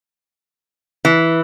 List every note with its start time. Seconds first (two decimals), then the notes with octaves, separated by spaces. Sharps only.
1.05 E3